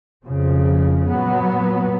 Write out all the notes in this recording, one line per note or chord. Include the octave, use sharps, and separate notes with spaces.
F2 C#3 F3
A#2 F#3 B3